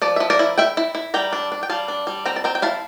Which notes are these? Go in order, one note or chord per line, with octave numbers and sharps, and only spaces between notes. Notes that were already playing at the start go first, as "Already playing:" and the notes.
F3 D5
F3 E5
A#4 D5
E4
E4 E5 G5
E4
E4
G3 G5 A#5
D4
D4
G5
G3 F5 A5
D4
G3
C4 G5 A#5
A5
C4 G5 A#5
G5
E4 F5 A5